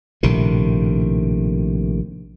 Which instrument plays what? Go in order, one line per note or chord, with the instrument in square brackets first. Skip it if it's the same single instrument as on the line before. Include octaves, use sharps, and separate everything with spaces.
[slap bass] A#1 A2 C3 D#3